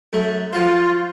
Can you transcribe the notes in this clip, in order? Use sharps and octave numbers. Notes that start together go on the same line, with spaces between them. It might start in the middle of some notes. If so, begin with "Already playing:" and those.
F#2 A3
F3 F4 F#4 C5